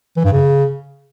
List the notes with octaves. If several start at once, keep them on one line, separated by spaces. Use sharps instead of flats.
E3
G2
C#3